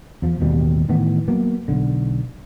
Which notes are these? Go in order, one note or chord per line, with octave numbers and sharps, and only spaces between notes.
E2 F3
A1 D#2 B2 G3
A2 D#3 E3 B3
F#3 A#3 B3
B1 D3